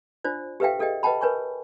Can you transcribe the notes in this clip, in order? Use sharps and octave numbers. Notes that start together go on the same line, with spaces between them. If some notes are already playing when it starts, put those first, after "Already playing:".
D4 F4 C5 D5
G4 A4 B4 E5 F5 G5
G#4 A4 D5 D#5 G5
B4 D#5 F#5 G5 A5 B5
A#4 B4 C#5 G#5 C#6